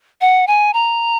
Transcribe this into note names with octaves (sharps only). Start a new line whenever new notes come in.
F#5
G#5
A#5